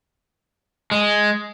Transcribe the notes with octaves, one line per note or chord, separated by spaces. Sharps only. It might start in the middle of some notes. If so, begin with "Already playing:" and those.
G#3